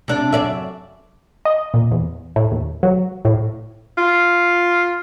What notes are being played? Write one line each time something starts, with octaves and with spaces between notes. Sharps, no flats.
C3 D4
F#2 D5 E5
D#5
A#2
E2
A2
D#2
F#3
A2
F4